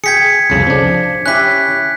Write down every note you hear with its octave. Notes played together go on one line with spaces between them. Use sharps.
G#4 G5 G#6 B6 C#7
C2 F2 C#3
F3 D4
C#4 E4 G4 F#6 B6